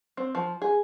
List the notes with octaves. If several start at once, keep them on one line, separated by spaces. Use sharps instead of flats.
C4
F3
G#4